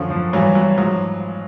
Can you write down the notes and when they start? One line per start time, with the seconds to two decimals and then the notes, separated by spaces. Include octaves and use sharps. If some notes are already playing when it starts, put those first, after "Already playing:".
Already playing: F#2 D3 F3
0.10 F3
0.33 G2 E3 F#3
0.55 F#3
0.78 G#2 F3 F#3